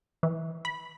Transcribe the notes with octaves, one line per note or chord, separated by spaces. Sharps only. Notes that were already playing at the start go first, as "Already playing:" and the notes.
E3
B5